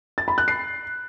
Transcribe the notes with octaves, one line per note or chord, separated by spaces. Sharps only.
A6
B5
F#6
C7